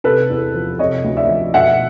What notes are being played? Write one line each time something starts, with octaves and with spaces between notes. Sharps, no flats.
C3 A4 B4
E2
F3
C3 C#5 D#5
D2
D5 E5
F3
B2 E5 F#5